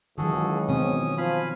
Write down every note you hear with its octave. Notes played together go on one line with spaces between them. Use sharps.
C#2 D#3 E3 F#3 F#4 G#4 A4
B2 D#3 C4 C#4 D#6
F3 F5 G#5 B5